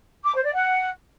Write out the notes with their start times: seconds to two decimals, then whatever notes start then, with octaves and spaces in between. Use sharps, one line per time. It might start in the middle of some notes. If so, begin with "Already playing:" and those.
0.24 D6
0.34 C5
0.44 D5
0.54 F#5